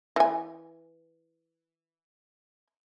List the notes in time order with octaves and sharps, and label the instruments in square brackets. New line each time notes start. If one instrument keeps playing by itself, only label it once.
[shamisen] E3 G#5